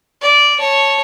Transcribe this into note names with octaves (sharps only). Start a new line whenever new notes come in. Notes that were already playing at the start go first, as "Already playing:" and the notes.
D5
C#5 A5